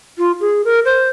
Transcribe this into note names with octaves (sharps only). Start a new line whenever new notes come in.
F4
G#4
A#4
C5